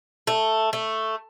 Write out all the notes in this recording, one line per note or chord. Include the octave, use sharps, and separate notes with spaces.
A3
A3